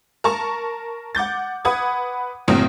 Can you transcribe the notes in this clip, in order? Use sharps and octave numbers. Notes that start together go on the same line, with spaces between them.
A#4 A5 C#6
F#5 D6 G6 A6
B4 F#5 D#6 G#6
F#1 A2 F#3 C4 D#6 D7